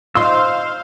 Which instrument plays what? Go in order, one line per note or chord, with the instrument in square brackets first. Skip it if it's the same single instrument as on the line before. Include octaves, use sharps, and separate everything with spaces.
[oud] D#4 F4 [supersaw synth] C5 F5 [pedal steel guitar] C6 E6